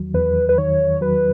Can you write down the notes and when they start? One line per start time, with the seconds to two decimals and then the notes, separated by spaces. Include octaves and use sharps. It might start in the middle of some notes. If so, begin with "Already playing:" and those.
Already playing: E2 D#3 F#3
0.14 E2 B4
0.49 B4
0.58 D#3 C#5
1.01 F#3 B4